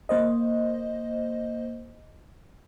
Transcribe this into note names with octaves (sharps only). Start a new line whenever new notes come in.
A#3 C5 D#5